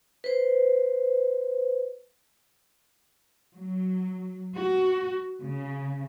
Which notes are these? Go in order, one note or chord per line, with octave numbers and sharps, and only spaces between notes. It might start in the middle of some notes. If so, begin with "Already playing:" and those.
B4 C5
F#3
F#4
C#3